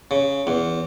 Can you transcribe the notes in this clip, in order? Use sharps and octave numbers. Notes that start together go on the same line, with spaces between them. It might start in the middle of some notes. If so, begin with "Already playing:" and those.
C#3
E2